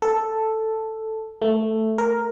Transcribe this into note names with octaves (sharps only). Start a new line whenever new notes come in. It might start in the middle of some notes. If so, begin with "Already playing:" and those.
A4
A3
A#4